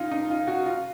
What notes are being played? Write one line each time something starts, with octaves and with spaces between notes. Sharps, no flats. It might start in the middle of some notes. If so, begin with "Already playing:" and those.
Already playing: C#3 D#4 F4
D#4
F4
F#4
F4